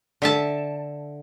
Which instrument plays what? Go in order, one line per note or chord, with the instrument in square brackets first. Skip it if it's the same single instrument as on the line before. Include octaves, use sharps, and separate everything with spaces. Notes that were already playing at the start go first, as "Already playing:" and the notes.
[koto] D3 E5 A5